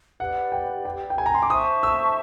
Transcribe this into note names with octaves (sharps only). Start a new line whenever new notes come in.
G4 B4 D5 F#5
G5
G5
G5
G#5
A#5
C6
D6
C5 E5 A5 C#6 D#6
E6